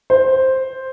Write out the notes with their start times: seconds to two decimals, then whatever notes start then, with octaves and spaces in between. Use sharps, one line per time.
0.10 C5